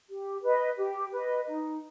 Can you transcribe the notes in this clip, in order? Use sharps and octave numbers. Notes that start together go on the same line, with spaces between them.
G4
B4 D#5
G4
B4 D#5
D#4